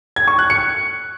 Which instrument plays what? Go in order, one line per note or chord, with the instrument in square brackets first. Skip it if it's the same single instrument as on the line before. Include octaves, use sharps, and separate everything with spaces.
[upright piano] G#6
C#6
F#6
C#7